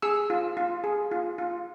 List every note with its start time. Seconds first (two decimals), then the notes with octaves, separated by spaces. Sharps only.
0.02 G#4 E6
0.30 F4
0.57 F4
0.84 G#4
1.11 F4
1.38 F4